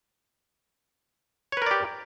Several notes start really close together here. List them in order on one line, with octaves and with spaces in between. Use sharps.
C#5 B4 A#4 D5 G4